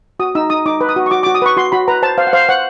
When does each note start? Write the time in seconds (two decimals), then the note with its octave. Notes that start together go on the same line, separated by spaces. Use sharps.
0.20 F#4 D#6
0.35 D#4 E6
0.50 D#4 D#6
0.66 D#4 D6
0.81 B4
0.89 D#6
0.96 F#4
1.06 C#6
1.11 F#4 D6
1.23 D6
1.27 F#4
1.35 D#6
1.42 B4 C#6
1.57 F#4 C6
1.72 F#4 B5
1.88 B4 A#5
2.03 C5 A5
2.18 C5 F5
2.27 F#5
2.33 C5 F5
2.49 C5 F#5